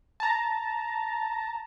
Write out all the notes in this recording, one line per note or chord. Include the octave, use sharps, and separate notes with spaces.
A5 A#5